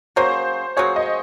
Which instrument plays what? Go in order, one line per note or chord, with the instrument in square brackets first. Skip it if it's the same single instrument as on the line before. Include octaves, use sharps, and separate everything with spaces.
[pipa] F#3 A#3 C#4 G#4 [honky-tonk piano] C5
[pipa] F#3 A#3 C#4 G#4 [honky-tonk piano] C#5
[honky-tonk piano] D#5